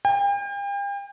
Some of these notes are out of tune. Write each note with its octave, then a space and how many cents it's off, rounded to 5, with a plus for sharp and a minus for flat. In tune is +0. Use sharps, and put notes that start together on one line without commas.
G5 +40